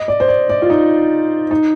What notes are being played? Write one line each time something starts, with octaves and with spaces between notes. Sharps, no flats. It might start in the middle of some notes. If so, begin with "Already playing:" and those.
Already playing: D#5
D5
C5
D5
D5
F4
D#4
D#4